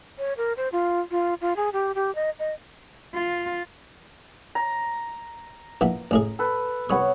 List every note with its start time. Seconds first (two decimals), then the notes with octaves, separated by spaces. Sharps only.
0.18 C#5
0.37 A#4
0.57 C5
0.72 F4
1.11 F4
1.41 F4
1.56 G#4
1.73 G4
1.95 G4
2.15 D#5
2.39 D#5
3.14 F4
4.55 A#5
5.81 A#1 B3 E4
6.11 A1 A2 G#4
6.39 A4 B4
6.90 C2 B3 C#5 D#6